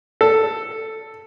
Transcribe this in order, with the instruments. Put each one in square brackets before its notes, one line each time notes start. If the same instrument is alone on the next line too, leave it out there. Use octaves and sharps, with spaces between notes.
[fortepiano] A4